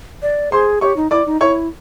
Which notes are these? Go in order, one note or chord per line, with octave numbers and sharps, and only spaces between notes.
D5
G#4 C5 C6
G4 C#5 C#6
D#4
E4 D5 D6
D#4
E4 C#5 C#6